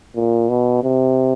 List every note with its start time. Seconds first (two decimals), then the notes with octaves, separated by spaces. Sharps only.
0.16 A#2
0.49 B2
0.84 C3